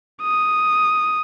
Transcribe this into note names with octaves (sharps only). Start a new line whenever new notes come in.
D#6